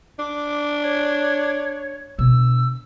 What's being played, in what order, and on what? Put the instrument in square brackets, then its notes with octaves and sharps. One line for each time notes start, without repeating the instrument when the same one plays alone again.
[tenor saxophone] D4 [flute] D6
[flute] C#5
[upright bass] B2 D3 [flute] E6